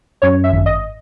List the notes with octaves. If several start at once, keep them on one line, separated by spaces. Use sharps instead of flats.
F#2 C#5
E5
G#1
D#5